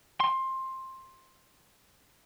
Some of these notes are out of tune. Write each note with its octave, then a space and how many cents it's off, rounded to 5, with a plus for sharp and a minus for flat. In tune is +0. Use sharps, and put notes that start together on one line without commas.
C6 +15